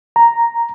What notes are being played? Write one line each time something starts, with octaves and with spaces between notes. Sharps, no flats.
A#5